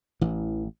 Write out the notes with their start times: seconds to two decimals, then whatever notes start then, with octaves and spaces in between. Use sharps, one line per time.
0.21 A1 E3